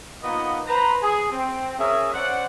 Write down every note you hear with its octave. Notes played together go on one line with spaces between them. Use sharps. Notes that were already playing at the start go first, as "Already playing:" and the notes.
A#3 B3 D#4 F4 D#5 F#5
B4 C5 A#5
G#4
C4
C#4 G#4 A#4 E5
C#4 C5 D5 F#5